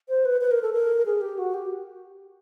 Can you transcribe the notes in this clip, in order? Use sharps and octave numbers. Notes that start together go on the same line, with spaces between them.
C5
B4
B4
A#4
A4
A#4
G#4
G4
F#4
G4